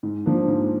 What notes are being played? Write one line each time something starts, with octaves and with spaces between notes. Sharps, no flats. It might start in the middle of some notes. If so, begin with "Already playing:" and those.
G#2
F3 A#3 D4
G#2